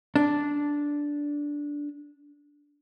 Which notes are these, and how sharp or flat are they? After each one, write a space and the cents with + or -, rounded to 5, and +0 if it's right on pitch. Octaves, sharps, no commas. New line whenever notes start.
D4 -10